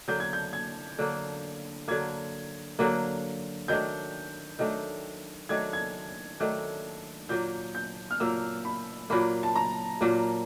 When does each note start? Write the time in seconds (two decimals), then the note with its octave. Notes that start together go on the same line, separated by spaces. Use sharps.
0.08 D3 F#3 A#3 G6
0.20 G#6
0.33 G6
0.53 G#6
0.99 D3 F#3 A#3
1.88 D3 F#3 A#3 G#6
2.79 D3 F#3 A#3
3.68 D#3 F#3 A3 D4 G6
4.59 D#3 F#3 A3 D4
5.49 D#3 F#3 A3 D4 G#6
5.73 G#6
6.40 D#3 F#3 A3 D4
7.29 A#2 F#3 A#3 G6
7.75 G6
8.11 F6
8.20 A#2 F#3 A#3 E6
8.65 B5
9.10 A#2 F#3 A#3 B5
9.43 A5
9.55 A#5
10.01 A#2 F#3 A#3